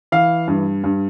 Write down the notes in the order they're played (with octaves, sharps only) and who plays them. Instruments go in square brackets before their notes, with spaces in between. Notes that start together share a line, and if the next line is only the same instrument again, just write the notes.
[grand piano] E3 F5
G2
G2